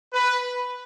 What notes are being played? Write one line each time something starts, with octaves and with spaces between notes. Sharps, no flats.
B4